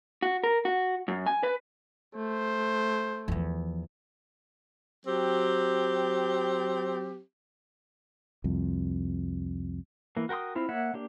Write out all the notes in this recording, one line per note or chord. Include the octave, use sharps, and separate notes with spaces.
F#4
A#4
F#4
F#2
G#5
B4
A3 C5
E2 F3
F#3 C4 G4
C2 F2
E3 A#3
F#4 A#4 G5 C6 D#6
C4 E4 F4
A#3 C#5 E5 F#5
A#3 D4 G4